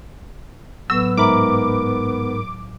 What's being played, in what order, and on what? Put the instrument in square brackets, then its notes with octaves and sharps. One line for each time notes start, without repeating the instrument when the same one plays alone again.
[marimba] A2 F#3 [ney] B3 [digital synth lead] E6
[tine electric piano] G#2 A#4 B5 [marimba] E5 A#5 [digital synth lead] D6